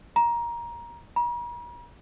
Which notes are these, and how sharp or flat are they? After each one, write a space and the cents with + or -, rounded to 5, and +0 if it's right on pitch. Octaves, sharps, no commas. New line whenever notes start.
A#5 +20
A#5 +45